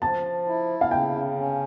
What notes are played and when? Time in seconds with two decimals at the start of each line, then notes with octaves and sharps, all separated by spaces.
0.01 F3 A5
0.46 E4
0.81 F5
0.91 C#3 G5
1.37 C#4